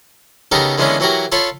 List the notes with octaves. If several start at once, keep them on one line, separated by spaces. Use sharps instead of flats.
C#3 B3 D#4 G4 A4 A#4
D3 E3 G#3 A#3 B3 C#4
E3 F#3 F#4 G4 A#4
F4 A4 C#5 F5 B5